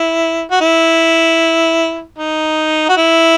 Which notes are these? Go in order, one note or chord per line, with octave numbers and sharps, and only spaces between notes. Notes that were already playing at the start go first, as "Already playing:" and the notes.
Already playing: E4
F#4
E4
D#4
F#4
E4